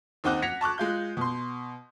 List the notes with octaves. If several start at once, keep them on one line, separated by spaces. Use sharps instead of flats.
D#2 C4 D#4 F#5 D6 F#6
F#5 G#6 A#6 B6 C#7 F7
A5 C#6 D6 F#6
G#3 F4 G6
B2 C6